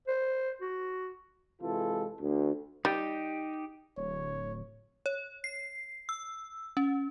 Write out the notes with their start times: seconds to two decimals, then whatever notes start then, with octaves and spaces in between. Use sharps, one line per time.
0.08 C5
0.61 F#4
1.62 C3 E3 G#3 F4 A4
2.20 D2
2.85 G3 D#4 G4
3.97 D1 C#5
5.06 C#5
5.44 C7
6.09 E6
6.77 C#4